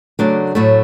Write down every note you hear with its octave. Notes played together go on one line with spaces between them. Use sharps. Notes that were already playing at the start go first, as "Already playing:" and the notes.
C#3 F#3 A3 D4 D5
A2 F#3 A3